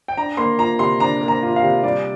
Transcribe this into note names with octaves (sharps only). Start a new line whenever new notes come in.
G5
D4 A#5
A#3 C6
F4 A#5
C3 C6
D4 A#5
A#3
A#5
F4
F5
C3
G3 D5